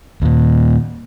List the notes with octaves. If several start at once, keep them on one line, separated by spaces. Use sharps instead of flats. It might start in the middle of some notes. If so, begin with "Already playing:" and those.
D#2 A#2